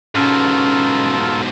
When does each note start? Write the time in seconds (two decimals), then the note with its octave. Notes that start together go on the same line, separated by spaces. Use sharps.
0.15 G#2 B2 C#4 F4 A4 A#4